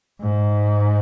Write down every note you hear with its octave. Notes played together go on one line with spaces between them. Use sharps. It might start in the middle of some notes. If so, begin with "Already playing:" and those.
G#2